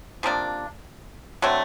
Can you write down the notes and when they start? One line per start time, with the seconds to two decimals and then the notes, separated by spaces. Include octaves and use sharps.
0.23 C3 F3 A#3 D4
1.42 D3 F#3 A3 C4